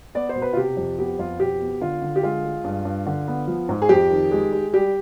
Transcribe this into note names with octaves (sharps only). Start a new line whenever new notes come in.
B3 D5
C5
B2
B4
F4
C3 G4
F2
B3 G4
F2 F4
B2 G4
B3
D3 F4
D3
G4
G#3 F4
G#3
G2
G2
D3
B3
F3
G#2
G#4
F2 G4
D#3
G#3
G#3
G3 G4